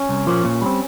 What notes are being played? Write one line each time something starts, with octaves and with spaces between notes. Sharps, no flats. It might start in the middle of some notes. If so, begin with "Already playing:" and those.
Already playing: C#4
C2
A#2 F3 A#3
A#2
G3 C4